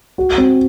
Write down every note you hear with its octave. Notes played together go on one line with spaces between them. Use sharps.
F#4
C4